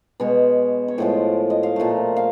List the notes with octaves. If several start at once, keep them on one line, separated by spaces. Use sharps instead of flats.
B2 G#3 C#5
C#5
A2 F3 G#3 C5
D#5
F5
A#2 F3 A3
F5